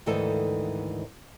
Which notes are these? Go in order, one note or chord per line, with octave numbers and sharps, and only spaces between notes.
D2 G#2 D#3 E3 A4 D#5